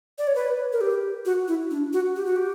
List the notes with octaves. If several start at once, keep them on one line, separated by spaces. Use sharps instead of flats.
D5
C#5
B4
A#4
G4
F#4
E4
D4
F#4
G4
F#4
G4